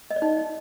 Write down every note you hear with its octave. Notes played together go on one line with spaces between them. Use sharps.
D#5
D5
D#4